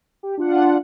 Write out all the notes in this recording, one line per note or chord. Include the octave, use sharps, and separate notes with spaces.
G4
D4 F4 F#5